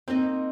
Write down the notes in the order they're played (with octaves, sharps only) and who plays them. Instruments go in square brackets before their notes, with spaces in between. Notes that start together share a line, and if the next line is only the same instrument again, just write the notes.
[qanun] A#3 D#4 A#4 D#5 [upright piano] C4